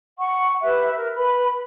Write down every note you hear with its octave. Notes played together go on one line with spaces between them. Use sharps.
F#5 C#6
G4 B4 E5 F#6
A#4
B4 B5